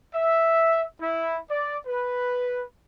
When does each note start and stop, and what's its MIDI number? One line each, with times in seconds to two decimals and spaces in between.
0.14 0.86 76
1.01 1.39 64
1.50 1.77 74
1.86 2.64 71